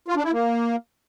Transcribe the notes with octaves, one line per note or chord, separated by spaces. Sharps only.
F4
D4
E4
A#3